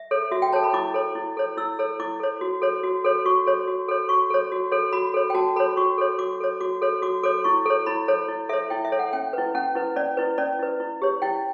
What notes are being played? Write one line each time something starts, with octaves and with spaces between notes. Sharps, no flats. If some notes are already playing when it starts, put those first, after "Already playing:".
Already playing: E5
A4 C#5
F#4 E5
G5
A4 C#5 A5
B5
E4 D6
A4 C#5
E4
A4 C#5
E4 E6
A4 C#5
E4 D6
A4 C#5
F#4
A4 C#5
F#4
A4 C#5
F#4 C#6
A4 C#5
F#4
A4 C#5
F#4 C#6
A4 C#5
F#4
A4 C#5
F#4 B5
A4 C#5
G5
F#4 A5
A4 C#5 B5
F#4 C#6
A4 C#5
F#4 D6
A4 C#5
F#4 D6
A4 C#5
F#4 D6
A4 C#5 D6
E4 C#6
A4 C#5
E4 B5
A4 C#5
E4
A4 C#5 E5
E4 G5
E5
A4 C#5
F#5
C#4 G5
E4 B4
C#4 F#5
E4 B4
C#4 D5
E4 B4
C#4 D5
E4 B4
E4
G4 C#5
E4 G5